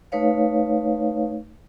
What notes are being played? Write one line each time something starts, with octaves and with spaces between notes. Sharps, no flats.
A3 D#4 B4 C#5 F5